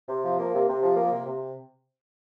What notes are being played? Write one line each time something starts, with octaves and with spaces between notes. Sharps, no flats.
C3
F3
A#3
C3
C3
F3
A#3
C3
C3